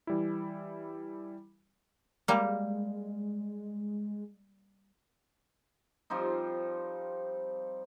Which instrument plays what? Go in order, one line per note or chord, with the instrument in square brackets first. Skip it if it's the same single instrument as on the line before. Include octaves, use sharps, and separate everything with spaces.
[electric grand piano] E3 G3 E4
[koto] G3 A#3 [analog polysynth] G#3
[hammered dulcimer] F3 G3 C4 D#4